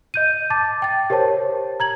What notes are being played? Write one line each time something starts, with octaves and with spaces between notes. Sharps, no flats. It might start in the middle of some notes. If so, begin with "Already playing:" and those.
D#5 G6 D#7
A5 D6 A6
G5 A6
G4 A#4 C5 C#5 A5
A#5 G#6 F#7